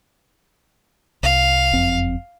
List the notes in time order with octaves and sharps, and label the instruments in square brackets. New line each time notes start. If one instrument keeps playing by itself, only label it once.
[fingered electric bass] C2 [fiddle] F5
[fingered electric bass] F#1 F2 C4